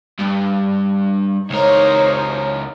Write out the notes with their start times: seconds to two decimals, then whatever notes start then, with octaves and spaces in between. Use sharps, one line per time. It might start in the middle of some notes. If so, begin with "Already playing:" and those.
0.19 G2
1.50 C#2 D#4 A#4 C5 C#5